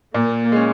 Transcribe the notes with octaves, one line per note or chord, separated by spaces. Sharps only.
A#2 A#3
G#3 C#4